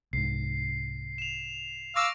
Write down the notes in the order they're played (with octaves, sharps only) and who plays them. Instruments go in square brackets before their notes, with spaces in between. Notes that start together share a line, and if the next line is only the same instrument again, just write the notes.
[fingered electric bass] C2 G#2 [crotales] C7
[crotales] E7 F7
[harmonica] F5 D6 E6 [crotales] C#6 A#6 D7